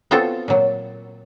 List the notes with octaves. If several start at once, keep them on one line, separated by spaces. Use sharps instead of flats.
B3 C4 F4 F#4 A4
A#2 F#3